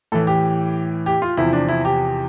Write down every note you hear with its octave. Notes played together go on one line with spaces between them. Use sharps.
A2 E3 A4
G4
G4
F4
E2 C3 F3 E4
D4
E4
G4